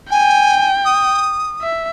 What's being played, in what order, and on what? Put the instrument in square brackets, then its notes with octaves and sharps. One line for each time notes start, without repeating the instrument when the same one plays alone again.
[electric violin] G5 [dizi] G#5
[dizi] D#6
[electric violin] E5